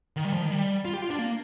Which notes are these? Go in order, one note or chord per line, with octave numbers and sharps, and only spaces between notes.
D#3
G3
F3
D#3
G3
F4
G4
F4
D4
A#3